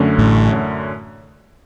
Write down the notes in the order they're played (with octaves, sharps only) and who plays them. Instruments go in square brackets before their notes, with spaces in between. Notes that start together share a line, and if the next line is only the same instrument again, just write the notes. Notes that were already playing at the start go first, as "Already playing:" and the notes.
Already playing: [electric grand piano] F#2 D3 A3 C#4
[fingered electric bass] A1 A2